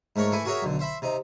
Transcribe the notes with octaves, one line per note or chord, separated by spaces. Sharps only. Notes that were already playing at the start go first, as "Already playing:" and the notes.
G#2 A3 A#4 C#5 C#6
E3 A3 E4 G#5 C#6
F#4 G#4 A#4 C#5 E5
B1 D3
C5 E5 B5
C3 D#4